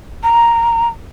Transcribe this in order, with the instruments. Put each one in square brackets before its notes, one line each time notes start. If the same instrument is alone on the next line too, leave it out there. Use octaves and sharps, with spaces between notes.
[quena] A#5